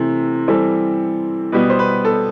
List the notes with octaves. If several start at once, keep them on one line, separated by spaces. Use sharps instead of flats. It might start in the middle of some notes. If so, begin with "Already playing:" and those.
Already playing: C3 E3 A3 C4
E3 G3 C4 A4
B2 G3 B3 B4
C5
B4
A4